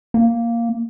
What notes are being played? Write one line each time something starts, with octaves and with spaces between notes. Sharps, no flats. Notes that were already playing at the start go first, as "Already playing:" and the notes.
A#3